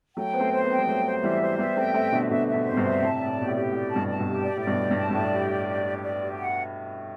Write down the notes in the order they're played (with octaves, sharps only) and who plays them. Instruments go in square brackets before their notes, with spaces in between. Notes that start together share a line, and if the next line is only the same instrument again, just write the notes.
[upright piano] F#3 A3 [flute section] G5
[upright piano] B3 [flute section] C5
[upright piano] A3 C4
[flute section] C5
[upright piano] B3
[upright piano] C4 [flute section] G5
[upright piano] G3 B3
[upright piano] F#3 A3 [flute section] C5
[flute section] C5
[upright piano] E3 G3 [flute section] E5
[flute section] C5
[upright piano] G3 B3 [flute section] E5
[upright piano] A3 C4 [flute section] G5
[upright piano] A3 C4 [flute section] E5
[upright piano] B2 D3 [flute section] E5
[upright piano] B2 D3 [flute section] E5
[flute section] E5
[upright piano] B2 D3
[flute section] C5
[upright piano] C3
G2 B2
[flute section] E5
[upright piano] A2 C3 [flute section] A5
[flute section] D5
[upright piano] A2
[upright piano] B2 [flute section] G4
[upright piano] A2
[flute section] G4
[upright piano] A2 [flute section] D5
[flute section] A5
[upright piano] G2 B2
[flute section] A5
[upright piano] G2 B2
[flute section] G4
D5
[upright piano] A2 [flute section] D5
[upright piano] G2 B2
[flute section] G4
[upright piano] G2
[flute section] A5
[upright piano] G2
[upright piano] A2 [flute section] D5
[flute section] G4
D5
G4
G4
D5
G4
F#5